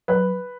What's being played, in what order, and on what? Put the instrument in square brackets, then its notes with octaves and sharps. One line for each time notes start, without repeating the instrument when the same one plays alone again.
[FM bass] F#3 [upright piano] B4